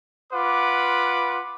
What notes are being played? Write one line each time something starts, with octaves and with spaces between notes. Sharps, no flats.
F4 B4 F#5 D6